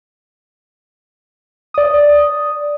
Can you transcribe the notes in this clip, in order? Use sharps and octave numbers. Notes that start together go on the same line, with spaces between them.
D5 D#6